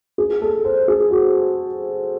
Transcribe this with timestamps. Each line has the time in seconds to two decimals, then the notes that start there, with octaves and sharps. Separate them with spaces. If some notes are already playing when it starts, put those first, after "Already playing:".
0.18 G#4
0.42 A4
0.64 C5
0.88 G#4
1.11 F#4